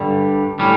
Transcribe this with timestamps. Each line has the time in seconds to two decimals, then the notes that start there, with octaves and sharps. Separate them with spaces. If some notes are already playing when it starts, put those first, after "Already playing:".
Already playing: G2 D3 G3
0.59 A2 G3 C#4